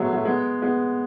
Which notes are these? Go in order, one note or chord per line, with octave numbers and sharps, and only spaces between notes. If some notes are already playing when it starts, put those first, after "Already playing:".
Already playing: F#3 G#3 A3 B3
F#3 A3
G#3 B3
G#3 B3